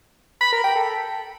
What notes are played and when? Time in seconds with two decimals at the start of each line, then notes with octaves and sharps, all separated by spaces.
0.41 B5
0.52 A#4
0.64 G5
0.75 A4